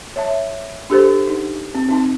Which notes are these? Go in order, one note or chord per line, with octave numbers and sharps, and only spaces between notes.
C#5 E5 A5
D4 G4 A4 C5
D#4
C4
C4 D#4 A5